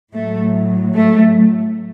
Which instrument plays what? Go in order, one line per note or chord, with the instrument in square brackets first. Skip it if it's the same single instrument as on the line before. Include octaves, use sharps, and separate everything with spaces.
[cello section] A2 F#3 A3
A3